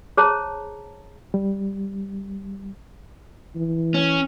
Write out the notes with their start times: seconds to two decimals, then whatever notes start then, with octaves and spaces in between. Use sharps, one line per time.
0.17 G#4 C5 C#5 A5 A#5
1.34 G3
3.56 E3
3.94 C#4